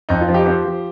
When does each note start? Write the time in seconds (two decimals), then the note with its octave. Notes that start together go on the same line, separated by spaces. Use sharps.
0.09 F2 D#4
0.21 F4
0.28 F3
0.34 D#4 G4
0.46 C4 G4 C5
0.65 F3